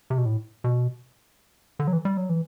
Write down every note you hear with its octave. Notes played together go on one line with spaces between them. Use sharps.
C3
B2
A2
B2
D3
F#3
E3
G3
F#3
E3